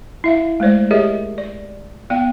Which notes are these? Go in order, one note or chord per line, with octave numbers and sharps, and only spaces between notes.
E4 E5 F5
G#3 A3 C5 D5
G4 G#4 A#4 C#5 D#5 E5
D5
B3 D5 F5 G5